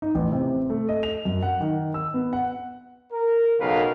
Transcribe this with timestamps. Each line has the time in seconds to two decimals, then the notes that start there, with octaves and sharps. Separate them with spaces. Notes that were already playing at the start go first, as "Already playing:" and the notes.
0.02 D#4
0.15 A1
0.32 C3
0.70 A3
0.89 D#5
1.03 F7
1.25 F#2
1.43 F#5
1.61 D#3
1.94 E6
2.14 B3
2.33 F#5
3.13 A#4
3.60 B1 C#3 A#4 B4 F5